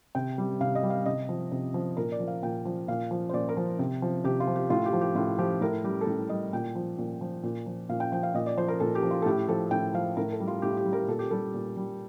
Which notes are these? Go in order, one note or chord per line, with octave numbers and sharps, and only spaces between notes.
C3 G5
G3
C3 F5
D#5
G3
F5
C3 D#5
F3
C3
F3
A#2 A#4
D5
F3
F5
A#2 G5
F3
A#2 F5
F3
C5
A#2 D5
A#4
F3
C3
F3
C3 G4
F4
F3
G4
A2 F4
G4
F3
G4
A2 F4
F3 G4
A2 A#4
G3 G4
A4
A2 G4
G3 D#5
A#2 G5
F3
A#2
F3
A#2
F3
A#2 F5
G5
F3 G5
F5
A#2 D#5
D5
F3 C5
A#4
A#2 A4
G4
F3
F4
A4
A2 G4
F3 A4
A2 G5
F3 F5
A2 A#4
A4
G3
F4
A2 G4
G4
G3
A#4
A#2 A4
G4
G3 A4
A#2
G3